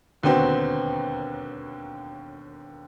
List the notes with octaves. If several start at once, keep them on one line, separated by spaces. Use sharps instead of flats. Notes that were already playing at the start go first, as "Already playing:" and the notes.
E1 D#2 D3 B3 C4 F#4